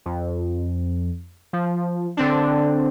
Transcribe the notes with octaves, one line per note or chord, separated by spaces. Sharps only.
F2
F3
D3 C4 D4